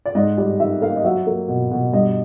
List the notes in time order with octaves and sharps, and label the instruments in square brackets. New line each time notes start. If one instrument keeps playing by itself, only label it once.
[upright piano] D5
G#2 D#5
G3 D5
D#3 E5
A#3 F5
D#5
F#3 E5
A#3
B2
B2
G2 D#5